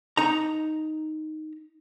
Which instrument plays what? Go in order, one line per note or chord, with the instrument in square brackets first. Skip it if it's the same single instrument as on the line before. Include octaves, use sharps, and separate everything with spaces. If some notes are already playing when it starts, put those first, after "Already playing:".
[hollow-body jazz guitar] D#4 A#5